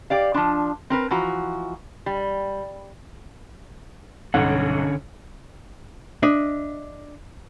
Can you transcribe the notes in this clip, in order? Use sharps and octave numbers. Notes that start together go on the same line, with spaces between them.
G4 D5 F5
F3 D4
C4 A#4 B4
E3 F3 F#4 A#5
G3
B1 G2 D3 C#4 F#5
D4 D#5 E5